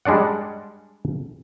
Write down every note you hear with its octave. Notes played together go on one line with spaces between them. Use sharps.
G3 G#3 D4 D5 F#5